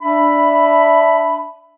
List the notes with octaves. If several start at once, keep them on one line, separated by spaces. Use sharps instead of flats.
D4 E5 B5